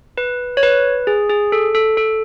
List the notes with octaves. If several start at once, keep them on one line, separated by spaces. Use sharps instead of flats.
B4
C#5
B4
G#4
G#4
A4
A4
A4